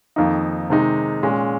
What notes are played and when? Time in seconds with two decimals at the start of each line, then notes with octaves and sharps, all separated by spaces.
0.16 F2 D#3 A#3 D#4
0.70 C3 D#3 G#3 D#4
1.23 A#2 G#3 C#4